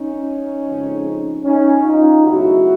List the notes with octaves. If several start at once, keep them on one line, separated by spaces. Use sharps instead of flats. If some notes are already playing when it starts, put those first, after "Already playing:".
Already playing: C#4 D#4
F2 C#3 F3 G#3
C#4 D#4
D#4 F4
C#2 B2 F#3 A3 E4 F#4